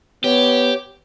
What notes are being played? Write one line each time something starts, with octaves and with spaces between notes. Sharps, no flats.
B3 G4 C#5